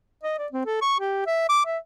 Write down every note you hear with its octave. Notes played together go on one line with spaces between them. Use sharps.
D#5
D5
C4
A4
C#6
G4
E5
D6
E5